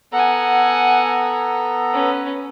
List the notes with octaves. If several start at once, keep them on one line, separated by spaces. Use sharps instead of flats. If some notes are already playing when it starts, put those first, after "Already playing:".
B3 A4 F#5 G#5 A#5
C#4 B4